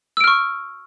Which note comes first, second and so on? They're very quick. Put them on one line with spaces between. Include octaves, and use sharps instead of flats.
E6 D7 F6 C#6